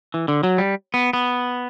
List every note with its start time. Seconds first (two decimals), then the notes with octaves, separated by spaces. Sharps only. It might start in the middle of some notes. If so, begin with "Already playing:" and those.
0.14 E3
0.28 D3
0.43 F#3
0.58 G3
0.94 B3
1.13 B3